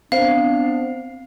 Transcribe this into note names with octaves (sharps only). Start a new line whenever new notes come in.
B3 C4 D4 C5 F5 C7